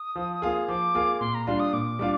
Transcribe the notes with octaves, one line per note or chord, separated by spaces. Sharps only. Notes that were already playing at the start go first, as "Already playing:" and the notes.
Already playing: D#6
F3
A#3 F4 G#4
F3 D6
A#3 F4 G#4
A#2 C6
A#5
G3 D4 F4 C6
D#6
A#2 D6
G3 D4 F4